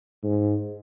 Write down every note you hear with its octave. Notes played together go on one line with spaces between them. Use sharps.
G#2